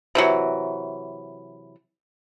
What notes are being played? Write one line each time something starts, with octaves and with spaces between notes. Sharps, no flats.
C3 E3 F#3